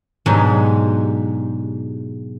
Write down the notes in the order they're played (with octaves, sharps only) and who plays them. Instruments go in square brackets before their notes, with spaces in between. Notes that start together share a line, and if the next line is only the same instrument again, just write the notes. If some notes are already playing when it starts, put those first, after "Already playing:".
[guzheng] G#2 B2 F#3 G#3 D4 G4